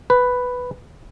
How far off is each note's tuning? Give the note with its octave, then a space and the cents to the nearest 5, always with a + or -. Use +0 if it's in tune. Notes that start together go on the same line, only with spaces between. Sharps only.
B4 +5